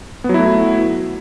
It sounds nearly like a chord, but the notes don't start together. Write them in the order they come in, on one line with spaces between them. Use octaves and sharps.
B3 F#3 E4 A3